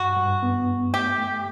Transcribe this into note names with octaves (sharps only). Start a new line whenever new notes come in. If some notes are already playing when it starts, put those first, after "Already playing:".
Already playing: G2 F#4
G2
B3
G2
A3 G4
A3